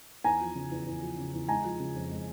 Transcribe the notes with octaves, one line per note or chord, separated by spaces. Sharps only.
E2 G#5 A#5
F3
C#3
E2
E2
F3
C#3
E2
G#3 G#5 A#5
F3
C#3
F2
G#3